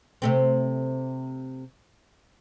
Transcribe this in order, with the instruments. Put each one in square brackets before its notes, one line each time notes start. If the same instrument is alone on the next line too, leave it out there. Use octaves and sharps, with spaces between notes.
[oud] C3 A3 C4